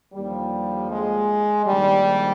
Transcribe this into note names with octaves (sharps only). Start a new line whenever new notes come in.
D#2 D3 F3 G3
G#3
A#1 G#2 D#3 G3